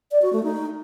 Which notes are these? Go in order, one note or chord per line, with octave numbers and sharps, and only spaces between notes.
D5
F#4
A3
D#4